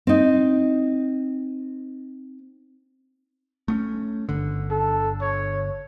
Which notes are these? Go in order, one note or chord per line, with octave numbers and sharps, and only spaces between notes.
C4 D#4
A3 B3 C#4
G1 D3
A4
C#5